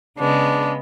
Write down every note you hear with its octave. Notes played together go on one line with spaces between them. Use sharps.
C#3 G#3 B3 D4